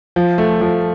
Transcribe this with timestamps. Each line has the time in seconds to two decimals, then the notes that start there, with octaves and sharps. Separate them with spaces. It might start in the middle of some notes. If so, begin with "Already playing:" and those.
0.16 F3
0.38 A3
0.61 F3